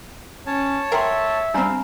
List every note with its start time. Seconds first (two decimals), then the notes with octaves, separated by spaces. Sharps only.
0.46 C#4 C#5 A5
0.92 A#4 E5 F#5 G5 C6
1.54 G3 C4 D4 F5 A#5 B5